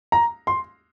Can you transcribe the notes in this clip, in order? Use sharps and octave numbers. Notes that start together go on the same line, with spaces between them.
A#5
C6